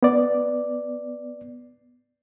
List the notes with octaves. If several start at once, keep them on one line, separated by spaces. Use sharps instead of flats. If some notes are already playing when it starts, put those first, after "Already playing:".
B3 D5